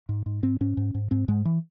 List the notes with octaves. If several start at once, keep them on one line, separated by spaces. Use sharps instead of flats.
G#2
G#2
G#2 C4
G#2 C#4
G#2
G#2
G#2 C4
G#2 G#3
E3